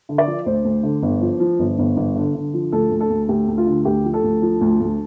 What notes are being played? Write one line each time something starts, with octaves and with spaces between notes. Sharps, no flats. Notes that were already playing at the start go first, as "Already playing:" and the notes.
D3
D5
F3
D2 C5
D2
D3
G1
F3
F3
G1
G1
G1
D3
D3
F3
D2 A4
D2
A4
D2
D2 G4
D2
F4
D3
D2 G4
F3
A4
D2
F3
D2
D2